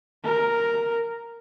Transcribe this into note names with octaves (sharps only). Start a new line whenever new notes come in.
A#4